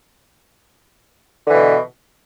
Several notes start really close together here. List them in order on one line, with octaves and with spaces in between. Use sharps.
D3 E3 B2